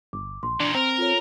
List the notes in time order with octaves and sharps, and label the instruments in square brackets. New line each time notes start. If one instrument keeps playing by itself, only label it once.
[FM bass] G1 [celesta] D6
[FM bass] A#1 [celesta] C6
[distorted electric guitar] E2 A#2 [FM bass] D4
[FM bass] C4 [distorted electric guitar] A#4
[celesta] F4 A4 C#5